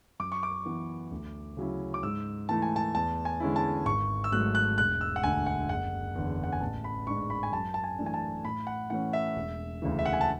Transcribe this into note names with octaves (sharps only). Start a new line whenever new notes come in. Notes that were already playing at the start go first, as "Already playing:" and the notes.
F#2 D6
C#6
D6
E3 B3
D2
C#3 F#3 C#4 E4
D6
G#2 E6
E3 A3 E4 A5
G#5
A5
E2 A5
G#5
D3 G#3 C#4 E4
A5
G#1 C#6
E6
G#2 F#3 A3 F#6
F#6
E1 F#6
E6
F#5
D2 D3 G#5
F#5
F#1 F#5
E2 D3
F#5
G#5
A1 A5
B5
G#2 G#3 D4 C#6
B5
G#5
F#2 A5
A5
G#5
E3 A3 D4
G#5
A5
A2 B5
F#5
E3 A3 C#4 F#5
E5
E1
D2 C#3 E3
E5
F#5
G#5
A5